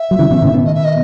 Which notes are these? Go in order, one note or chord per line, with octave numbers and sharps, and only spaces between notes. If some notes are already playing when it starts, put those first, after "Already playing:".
Already playing: E5
F#3
C#3 E3
B2 D#3
A2 C#3
B2 D#3
D#5
E5
D#5